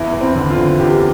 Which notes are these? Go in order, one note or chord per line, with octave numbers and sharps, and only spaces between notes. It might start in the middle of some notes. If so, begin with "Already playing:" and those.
Already playing: E2 E4
E2
C4
D3
F4
D3
E2 G4